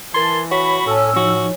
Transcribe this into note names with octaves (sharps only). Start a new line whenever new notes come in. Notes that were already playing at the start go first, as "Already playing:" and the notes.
E3 A#4 A5 C6 G#6
F#4 C#5 B5
A2 C#4 A4 A5 E6
F3 C#4 D#4 F#4